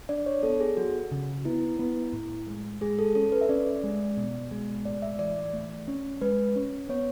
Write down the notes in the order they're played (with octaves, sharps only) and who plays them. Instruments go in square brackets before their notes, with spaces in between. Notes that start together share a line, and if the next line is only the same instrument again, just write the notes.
[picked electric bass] D4 [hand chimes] D5
[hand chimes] C#5
[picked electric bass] B3 [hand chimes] A4
[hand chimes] G#4
[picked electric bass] F#3 [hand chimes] F#4
[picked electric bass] C#3
[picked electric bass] B3 [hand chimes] E4
[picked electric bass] B3
A2
G#3
[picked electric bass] G#3 [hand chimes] G#4
[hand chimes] A4
[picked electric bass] C#4 [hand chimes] A4
[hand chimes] B4
E5
[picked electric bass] C#4 [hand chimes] D5
[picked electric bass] G#3
B2
G#3
[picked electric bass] A2 [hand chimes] D5
[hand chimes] E5
[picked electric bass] E3 [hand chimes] D5
[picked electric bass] A3
C#4
[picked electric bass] G#3 [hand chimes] B4
[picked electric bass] C#4
[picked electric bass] B3 [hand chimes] C#5